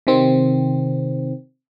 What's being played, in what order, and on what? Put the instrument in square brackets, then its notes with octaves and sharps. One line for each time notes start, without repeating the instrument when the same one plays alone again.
[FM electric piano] C3 D#3 C4